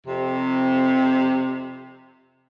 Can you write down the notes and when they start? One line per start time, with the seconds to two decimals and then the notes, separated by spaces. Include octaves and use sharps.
0.07 F2 C3